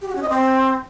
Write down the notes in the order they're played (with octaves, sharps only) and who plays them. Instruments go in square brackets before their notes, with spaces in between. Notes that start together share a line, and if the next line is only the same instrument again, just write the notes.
[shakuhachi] G4
F#4
C#4
D#5
C4